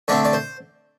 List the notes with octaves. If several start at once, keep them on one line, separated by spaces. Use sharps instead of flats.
D3 A3 C4 D5
D5
C5